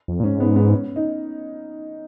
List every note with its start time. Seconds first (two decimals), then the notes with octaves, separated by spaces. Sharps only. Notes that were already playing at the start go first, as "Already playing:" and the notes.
0.08 F2
0.20 A#2
0.24 G#2 C#4
0.40 B3
0.56 B3
0.72 C#4
0.96 D#4